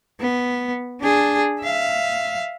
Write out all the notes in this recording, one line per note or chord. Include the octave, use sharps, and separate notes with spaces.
B3
D4 G#4
E5 F5